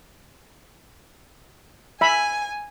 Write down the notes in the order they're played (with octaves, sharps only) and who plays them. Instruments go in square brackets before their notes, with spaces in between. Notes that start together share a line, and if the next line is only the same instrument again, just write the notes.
[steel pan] E5 B5 [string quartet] G#5